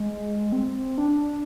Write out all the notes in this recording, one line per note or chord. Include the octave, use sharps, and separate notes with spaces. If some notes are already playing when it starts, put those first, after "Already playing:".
Already playing: G#3
C4
D4